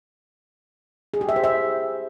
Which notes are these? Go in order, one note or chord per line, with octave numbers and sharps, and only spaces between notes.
G#4
G4
E5
C5
E5